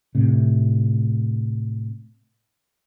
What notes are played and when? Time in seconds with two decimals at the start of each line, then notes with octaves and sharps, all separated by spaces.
0.15 A2 C3